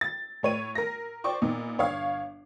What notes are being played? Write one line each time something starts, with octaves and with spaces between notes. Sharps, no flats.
A6
A2 C#5 D#7
A#4 A#6
C5 D5 G5 C#6 D6
A#2 B3 D#4
G1 C#5 F5